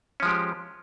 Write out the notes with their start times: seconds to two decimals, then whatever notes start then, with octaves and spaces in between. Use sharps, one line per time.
0.20 C#4
0.23 F3
0.25 G#3
0.28 G4